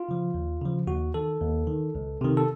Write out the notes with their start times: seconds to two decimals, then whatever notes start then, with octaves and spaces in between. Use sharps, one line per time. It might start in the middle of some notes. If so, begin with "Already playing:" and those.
Already playing: F4
0.09 C#3 F3
0.34 D#2
0.62 C#3 F3
0.87 D#2 F#4
1.14 D#3 A4
1.41 D#2
1.67 D#3
1.95 C#2
2.21 C3 D#3
2.37 A4